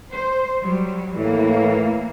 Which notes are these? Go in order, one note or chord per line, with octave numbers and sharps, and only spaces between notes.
C5
F#3 G3
A2 E3 A#3